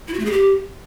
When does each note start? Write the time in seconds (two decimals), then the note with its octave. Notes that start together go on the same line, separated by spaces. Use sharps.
0.08 E4
0.14 F#4
0.20 A3
0.25 G#4
0.31 G4